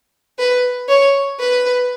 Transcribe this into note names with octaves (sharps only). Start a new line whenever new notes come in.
B4
C#5
B4